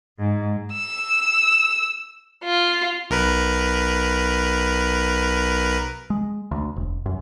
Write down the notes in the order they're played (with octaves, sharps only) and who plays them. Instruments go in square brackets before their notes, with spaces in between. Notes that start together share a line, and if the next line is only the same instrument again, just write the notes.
[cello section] G#2
[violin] E6
F4
[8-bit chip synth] B1 A#4 B4
[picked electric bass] G#3
D2
E1
F#2